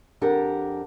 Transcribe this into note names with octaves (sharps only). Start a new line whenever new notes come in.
F2 D4 G4 A#4 F#5